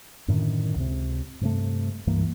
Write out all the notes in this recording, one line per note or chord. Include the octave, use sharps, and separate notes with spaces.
F#2 A2 D3 D#3
C#2 C3 C4
G2 C3 A3
C#2 G2 E3 A#3